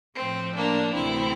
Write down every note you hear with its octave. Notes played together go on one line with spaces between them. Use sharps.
A2 F3 A3 C4
A#3 D4
D2 C3 E3 A3 C4 E4